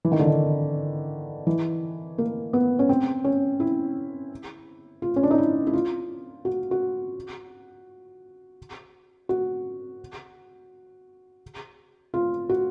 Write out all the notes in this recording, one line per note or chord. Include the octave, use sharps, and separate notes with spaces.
E3
D#3
D3
D#3
E3
A#3
B3
C#4
C4
C#4
E4
F4
C#4
D4
D#4
E4
E4
F4
F#4
F#4
F#4
F4
F#4